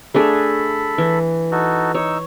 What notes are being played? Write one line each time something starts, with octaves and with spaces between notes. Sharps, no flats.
A3 D4 G#4 A4 B5
E3
D#4 F#4 A4
D#4 C#5 E6